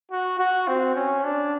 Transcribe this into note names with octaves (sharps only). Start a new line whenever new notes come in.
F#4
F#4
C4
C#4
D4